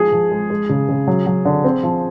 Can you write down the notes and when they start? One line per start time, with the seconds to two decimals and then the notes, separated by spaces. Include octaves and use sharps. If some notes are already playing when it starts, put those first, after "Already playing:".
Already playing: F3 G#3 G#4
0.12 F3
0.31 G#3
0.50 G#3
0.69 C#3
0.88 C#3
1.07 F#3
1.27 F#3
1.45 D3
1.64 C4
1.83 F3